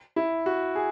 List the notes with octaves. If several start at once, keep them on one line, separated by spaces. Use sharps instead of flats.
E4
F#4
G#4